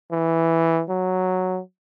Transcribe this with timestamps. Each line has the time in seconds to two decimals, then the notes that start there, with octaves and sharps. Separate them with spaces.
0.12 E3
0.89 F#3